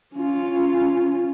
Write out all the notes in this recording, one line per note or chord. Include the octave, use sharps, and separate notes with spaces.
C#4 F4